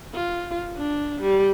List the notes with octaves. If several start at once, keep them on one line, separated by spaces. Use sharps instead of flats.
F4
D4
G3